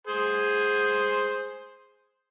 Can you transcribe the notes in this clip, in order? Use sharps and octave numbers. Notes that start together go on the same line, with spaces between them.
G#4 C5